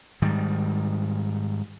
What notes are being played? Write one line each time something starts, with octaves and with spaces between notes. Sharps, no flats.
G#2 D#3 G3